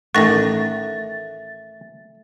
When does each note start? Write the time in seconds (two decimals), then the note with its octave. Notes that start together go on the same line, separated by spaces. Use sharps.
0.15 A1 D#3 A3 F#5 C#6 A6 A#6